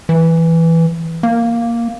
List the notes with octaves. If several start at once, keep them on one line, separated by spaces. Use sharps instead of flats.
E3
A#3